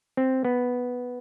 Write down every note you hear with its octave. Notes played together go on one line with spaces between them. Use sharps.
C4
B3